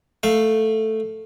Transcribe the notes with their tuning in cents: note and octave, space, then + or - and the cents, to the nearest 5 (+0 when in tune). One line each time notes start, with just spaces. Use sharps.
A3 +0 F5 +0